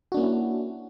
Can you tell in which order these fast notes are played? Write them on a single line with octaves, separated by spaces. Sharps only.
F#4 D4 A#3 C#4 E4